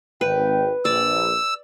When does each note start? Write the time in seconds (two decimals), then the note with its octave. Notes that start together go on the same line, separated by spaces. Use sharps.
0.21 G#1 B4 G5
0.85 A#1 D5 E6